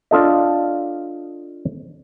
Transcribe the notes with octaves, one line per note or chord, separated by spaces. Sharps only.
D4 F4 A4 D#5